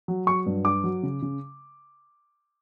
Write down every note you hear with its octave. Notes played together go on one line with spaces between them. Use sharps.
F#3
F#3 C#6
G2
D4 D6
F#3
C#3
C#3